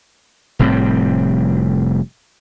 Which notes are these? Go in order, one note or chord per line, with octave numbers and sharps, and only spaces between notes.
F1 A2 G3 C4